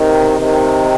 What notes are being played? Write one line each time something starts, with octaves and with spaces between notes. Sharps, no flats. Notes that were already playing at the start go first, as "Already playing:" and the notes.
Already playing: C3 D#3
C3 D#3